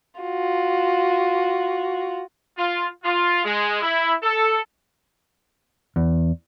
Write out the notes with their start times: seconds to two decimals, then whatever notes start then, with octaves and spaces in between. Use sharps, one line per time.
0.21 F4 F#4
2.57 F4
3.04 F4
3.44 G#3
3.82 E4
4.23 A4
5.96 E2